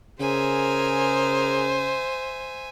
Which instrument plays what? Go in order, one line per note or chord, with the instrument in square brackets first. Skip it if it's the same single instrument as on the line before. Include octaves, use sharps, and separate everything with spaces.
[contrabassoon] C#3 [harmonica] G#4 A#4 [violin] C5 [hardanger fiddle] E5 G#5